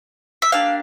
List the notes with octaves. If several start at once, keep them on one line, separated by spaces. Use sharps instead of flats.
E5
A#3 D4 G4 F5